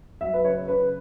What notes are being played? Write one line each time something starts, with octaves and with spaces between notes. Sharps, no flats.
F#3 E5
B4
C#3 C#5
C#3 B4